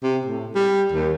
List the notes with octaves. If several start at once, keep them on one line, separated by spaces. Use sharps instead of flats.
C3
A2
G3
D#2